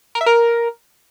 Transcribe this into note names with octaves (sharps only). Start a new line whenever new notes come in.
A#4
E5
A#4